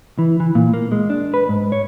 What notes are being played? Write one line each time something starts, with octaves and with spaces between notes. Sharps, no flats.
E3
E3
A#2
A#3
G#3
D4
B4
G#2
C#5